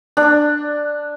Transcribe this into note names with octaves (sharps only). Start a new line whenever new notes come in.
D4